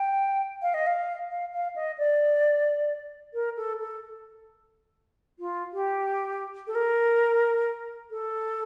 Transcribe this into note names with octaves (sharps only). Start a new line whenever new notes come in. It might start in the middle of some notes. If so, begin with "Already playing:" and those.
Already playing: G5
F5
D#5
F5
F5
F5
D#5
D5
A#4
A4
A4
F4
G4
A4
A#4
A4